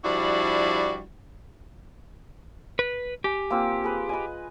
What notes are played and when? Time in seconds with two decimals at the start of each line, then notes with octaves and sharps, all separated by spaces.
0.04 F3 G3 D4 E4 F#4
2.79 B4
3.24 G4 G#5
3.50 A#3 C4 F4
3.84 G#4 B4
4.09 B4 D#5 G#5